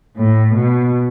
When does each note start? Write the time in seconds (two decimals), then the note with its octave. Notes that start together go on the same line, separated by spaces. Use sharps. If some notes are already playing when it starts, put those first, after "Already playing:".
0.17 A2
0.54 B2